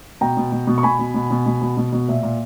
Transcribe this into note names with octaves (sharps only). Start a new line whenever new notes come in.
B2 G5 A#5
B2
B2
B2
C#6
B2 G#5 B5
B2
B2
B2
B2
B2
B2
B2
A#2 E5
A#2